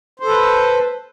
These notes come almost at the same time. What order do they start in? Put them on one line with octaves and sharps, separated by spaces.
C5 A4 B4